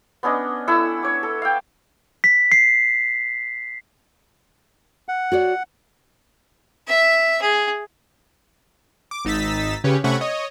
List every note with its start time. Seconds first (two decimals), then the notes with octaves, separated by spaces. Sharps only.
0.23 B3 C#4 D4 D#5
0.68 E4 A4 F#5 E6
1.03 C#5 D6
1.23 A4
1.42 F5 G5
2.24 B6
2.52 C7
5.09 F#5
5.32 F#4 C#5 D5
6.87 E5
7.42 G#4
9.11 D6
9.25 G#1 D#4 E6 A6 B6
9.84 C#3 C#4 G4 B4 C#5
10.04 C3 A3 C#4 F#5 B5 C#6
10.21 C#5 D#5